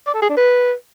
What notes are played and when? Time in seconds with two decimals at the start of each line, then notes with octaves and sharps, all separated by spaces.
0.07 D5
0.15 A4
0.22 G#4
0.30 D4
0.37 B4